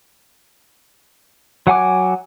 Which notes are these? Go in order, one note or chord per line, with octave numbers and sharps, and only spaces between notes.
F#3 F#5 G#5 D6